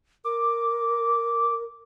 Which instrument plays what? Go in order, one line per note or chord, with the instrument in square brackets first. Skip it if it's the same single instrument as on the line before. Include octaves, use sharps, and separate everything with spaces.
[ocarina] A#4 [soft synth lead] D6